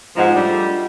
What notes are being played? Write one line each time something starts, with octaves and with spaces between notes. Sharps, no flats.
G#2 B2 F3 F4 D#5 F#5
G3 A3 D4